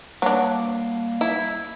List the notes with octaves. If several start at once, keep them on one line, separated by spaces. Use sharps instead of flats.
F#3 G3 A#3 D4 F5
E4